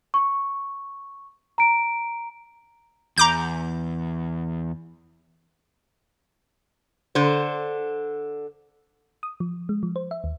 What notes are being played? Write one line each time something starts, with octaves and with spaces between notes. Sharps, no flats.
C#6
A#5 D7
E2 A#5 D6 G6
D3 C5
D#6
F3
G#3
F3
C5
E5
D#2